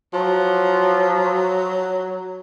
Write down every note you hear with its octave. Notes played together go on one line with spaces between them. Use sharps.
F3 F#3